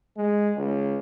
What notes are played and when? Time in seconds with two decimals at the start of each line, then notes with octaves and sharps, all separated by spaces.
0.17 G#3
0.57 C#2